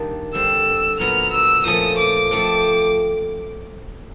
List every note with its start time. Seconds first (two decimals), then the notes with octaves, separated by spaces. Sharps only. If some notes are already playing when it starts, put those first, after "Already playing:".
Already playing: D#3 G3 A#3 D4
0.34 D3 G3 C4 E6
0.99 A#2 F#3 B3 F6
1.33 E6
1.65 A#2 F3 A3 C#4 D#6
1.99 D6
2.31 F3 A3 C4